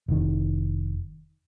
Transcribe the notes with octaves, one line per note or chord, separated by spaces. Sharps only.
F1 D#3